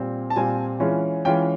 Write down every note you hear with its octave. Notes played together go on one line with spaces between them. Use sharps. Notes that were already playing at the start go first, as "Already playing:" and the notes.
Already playing: A#2 G3 C4 F4
A5
A#2 G3 C4 F4 G#5
E3 G#3 C#4 F4
E3 G#3 C#4 F4 G5